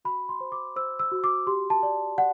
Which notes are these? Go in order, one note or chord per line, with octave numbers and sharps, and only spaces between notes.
F#4 B5
C6
C5
D6
C5 E6
E6
F#4
D6
G4 C6
A5
D5
D5 F#5